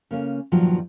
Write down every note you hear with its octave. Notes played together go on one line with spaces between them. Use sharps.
C#3 A#3 C#4
G2 A#2 D#3 F3 F#3